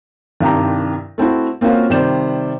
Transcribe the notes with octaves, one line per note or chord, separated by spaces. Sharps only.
C2 G2 D#3 G4 A#5
A3 C4 E4 F#4
A#3 C4 C#4 F4 F#4
C3 D#3 G3 C5 D5 E7